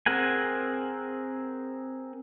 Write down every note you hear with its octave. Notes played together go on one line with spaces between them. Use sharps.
C4 G#4 A#4 F#5 G#5